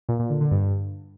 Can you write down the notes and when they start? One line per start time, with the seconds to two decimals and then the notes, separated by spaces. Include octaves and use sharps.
0.09 A#2
0.19 A#2
0.30 D3
0.41 D3
0.51 G2